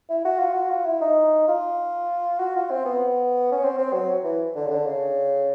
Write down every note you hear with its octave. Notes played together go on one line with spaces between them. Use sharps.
E4
F#4
F4
F#4
F4
E4
D#4
F4
F#4
F4
C4
B3
C#4
C4
C4
F#3
E3
D3
C#3
D3
C#3